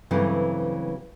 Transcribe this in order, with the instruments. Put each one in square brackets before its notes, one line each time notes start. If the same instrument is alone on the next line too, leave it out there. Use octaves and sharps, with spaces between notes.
[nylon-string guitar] G2 C#3 E3 F#3 A3 C4